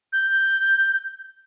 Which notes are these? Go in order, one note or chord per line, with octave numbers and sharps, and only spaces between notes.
G6